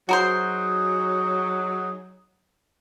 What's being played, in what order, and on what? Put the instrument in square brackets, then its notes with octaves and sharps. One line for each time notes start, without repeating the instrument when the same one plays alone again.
[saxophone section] F#3 [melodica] D#4 G#4 [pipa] F#4 A#4 C5